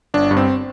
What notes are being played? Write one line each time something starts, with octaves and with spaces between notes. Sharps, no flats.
G1 D4
G2
C4